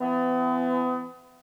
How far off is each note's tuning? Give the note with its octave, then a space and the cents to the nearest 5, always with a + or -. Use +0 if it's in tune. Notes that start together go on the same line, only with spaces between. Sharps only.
E3 +35 B3 +40